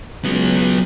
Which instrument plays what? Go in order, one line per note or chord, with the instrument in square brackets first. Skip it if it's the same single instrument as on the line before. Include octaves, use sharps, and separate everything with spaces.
[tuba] C#2 [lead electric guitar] F#3 B3